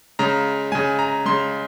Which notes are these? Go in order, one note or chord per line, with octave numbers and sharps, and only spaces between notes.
C#3 G#3 A#5
C#3 G#3 G#5
A#5
C#3 G#3 C6